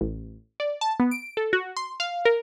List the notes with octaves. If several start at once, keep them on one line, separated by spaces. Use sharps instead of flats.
A1
D5
A5
B3
D7
A4
F#4
C6
F5
A#4